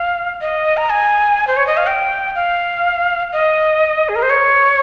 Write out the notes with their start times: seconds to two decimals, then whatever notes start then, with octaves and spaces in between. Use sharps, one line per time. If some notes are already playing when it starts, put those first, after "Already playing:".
Already playing: F5
0.41 D#5
0.77 A#5
0.90 G#5
1.47 C5
1.57 C#5
1.67 D#5
1.77 F5
1.87 G5
2.35 F5
3.33 D#5
4.09 G#4
4.16 A#4
4.22 C5
4.30 C#5